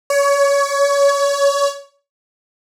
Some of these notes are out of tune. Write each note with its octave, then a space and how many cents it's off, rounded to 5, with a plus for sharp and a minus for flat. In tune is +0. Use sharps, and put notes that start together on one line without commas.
C#5 +25